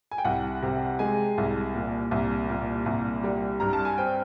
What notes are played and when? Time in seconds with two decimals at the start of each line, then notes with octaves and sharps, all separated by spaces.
0.11 G#5
0.18 G5
0.25 C2 F#5
0.63 C3
0.99 G#3 G#5
1.38 C2
1.75 A#2
2.11 C2
2.49 A#2
2.86 C2
3.24 G3
3.60 G2 A#5
3.73 A5
3.85 G#5
3.98 C4 G5